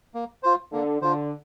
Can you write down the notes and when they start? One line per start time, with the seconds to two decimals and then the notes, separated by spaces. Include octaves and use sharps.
0.14 A#3
0.43 F4 C5
0.72 D3 A#3
1.01 D3 F4 C5